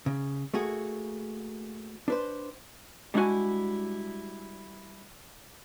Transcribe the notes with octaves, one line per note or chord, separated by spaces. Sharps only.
C#3
A3 A#3 F#4 G#4
D4 B4 C5
G3 G#3 D4 E4 F#4 G#5